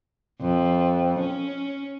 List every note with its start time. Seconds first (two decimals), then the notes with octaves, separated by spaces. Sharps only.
0.41 F2
1.20 C#4